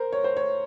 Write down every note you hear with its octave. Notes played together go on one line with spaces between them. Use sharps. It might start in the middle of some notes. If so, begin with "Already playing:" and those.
Already playing: A#4 C5
C#5
C5
C#5